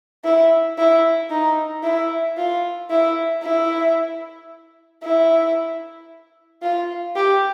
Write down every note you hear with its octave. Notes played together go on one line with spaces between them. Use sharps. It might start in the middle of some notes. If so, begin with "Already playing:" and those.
E4
E4
D#4
E4
F4
E4
E4
E4
F4
G4